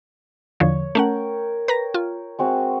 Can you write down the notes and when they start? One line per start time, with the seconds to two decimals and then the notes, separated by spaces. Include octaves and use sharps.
0.60 E2 D3 F3 C#5
0.95 A3 C#4 A#4 F#5 G5
1.68 B4 A#5 A#6
1.94 F4
2.39 G#3 C4 F#4